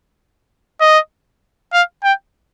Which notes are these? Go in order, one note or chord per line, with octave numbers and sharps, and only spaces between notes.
D#5
F5
G5